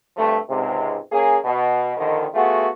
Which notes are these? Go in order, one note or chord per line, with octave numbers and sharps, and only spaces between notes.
G2 C3 F3 A3
C#2 G#2 C3
A#3 C#4 G#4
B2
A#1 D3 D#3
A3 B3 F4 F#4 G#4